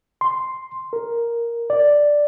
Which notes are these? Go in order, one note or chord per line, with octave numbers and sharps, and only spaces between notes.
C6
A#4
D5